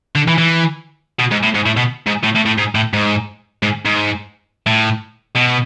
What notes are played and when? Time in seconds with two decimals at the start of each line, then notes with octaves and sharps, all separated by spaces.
0.15 D3
0.28 E3
0.38 E3
1.19 B2
1.31 G#2
1.43 A2
1.55 G#2
1.66 A2
1.77 B2
2.07 G#2
2.24 A2
2.36 A2
2.46 A2
2.58 G#2
2.75 A2
2.93 G#2
3.63 G#2
3.85 G#2
4.66 A2
5.35 B2